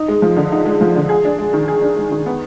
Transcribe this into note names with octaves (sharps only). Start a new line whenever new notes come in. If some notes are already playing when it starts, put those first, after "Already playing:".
Already playing: D#4
G#3
F3
D3
D#4
G#3
F3
D3
G#4
D4
G#3
D#3
G#4
D4
G#3
D#3
B3